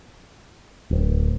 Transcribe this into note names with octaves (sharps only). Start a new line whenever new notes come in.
D1